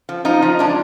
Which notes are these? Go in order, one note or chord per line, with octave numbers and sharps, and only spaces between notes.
F3
F3 D#4
F3
G#3 D4